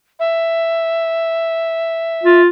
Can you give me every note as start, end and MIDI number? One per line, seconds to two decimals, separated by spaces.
0.20 2.41 76
2.23 2.49 65